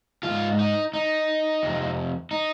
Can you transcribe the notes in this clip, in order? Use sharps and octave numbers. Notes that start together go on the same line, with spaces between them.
G#2 D#3 F4
D#4
D#4
F2 C3
D#4